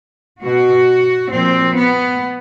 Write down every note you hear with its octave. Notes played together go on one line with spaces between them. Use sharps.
B2 F#4
A#2 F3 C4
B3